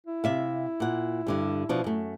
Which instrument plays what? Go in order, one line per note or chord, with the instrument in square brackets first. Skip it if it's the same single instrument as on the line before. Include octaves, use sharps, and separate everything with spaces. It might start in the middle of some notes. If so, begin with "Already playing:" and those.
[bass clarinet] E4
[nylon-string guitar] C3 E5 F5
A#2 F#5
G2 D3 G3
B2 F3 D4
F#2 A3